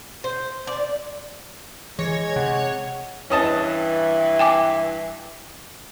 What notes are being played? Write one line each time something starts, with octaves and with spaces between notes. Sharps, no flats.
C5
D5
E3 G#3 C#5 A#6
C3 F#5
G2 E3 C#4 D#5 A5
G5 G#5 D6